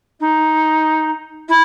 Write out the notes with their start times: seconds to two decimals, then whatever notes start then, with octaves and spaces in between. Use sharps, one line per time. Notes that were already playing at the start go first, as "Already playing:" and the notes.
0.20 D#4
1.48 E4